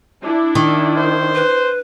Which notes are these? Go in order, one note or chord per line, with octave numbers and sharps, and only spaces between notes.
D4 E4
D#3
C5
B4